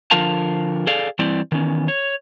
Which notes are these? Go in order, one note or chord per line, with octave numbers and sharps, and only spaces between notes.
D3 F3 F4 A#4 F5 A5
G#4 A4 D5 F5
E3 G3 C4 E4 D5
D#3 E3 B3 C#4
C#5